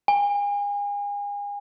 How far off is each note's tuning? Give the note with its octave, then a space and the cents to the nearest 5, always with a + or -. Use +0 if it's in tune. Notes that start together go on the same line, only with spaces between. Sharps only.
G#5 -35